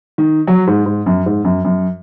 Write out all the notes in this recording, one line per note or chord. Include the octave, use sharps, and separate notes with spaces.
D#3
F#3
G#2
G#2
F#2
G#2
F#2
F#2